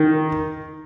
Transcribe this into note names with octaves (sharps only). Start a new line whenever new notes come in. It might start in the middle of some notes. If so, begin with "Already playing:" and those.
Already playing: D#3